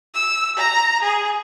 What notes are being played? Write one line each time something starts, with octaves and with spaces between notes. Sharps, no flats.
E6
A#5
G#4